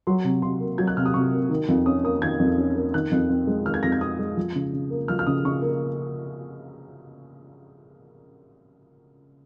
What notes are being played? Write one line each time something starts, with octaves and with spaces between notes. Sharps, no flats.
F#3 C6
C3
C3 C6
A#3
F#3 G#6
F#6
C3 F6
D#6
C3 C#6
A#3
D#3
F2
C#4 D#6
A#3 D#6
D#3 G#6
F2
C#4
A#3
D#3 F#6
F2
C4
G#3
D#3 F6
G#6
F2 A#6
G#6
C4 D#6
G#3
F3
C#3
C#3
A#3
F3 F6
F6
C#3 D#6
C#3 C#6
A#3